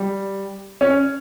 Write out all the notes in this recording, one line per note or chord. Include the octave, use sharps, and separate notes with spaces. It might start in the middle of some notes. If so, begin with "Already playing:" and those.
Already playing: G3
C#4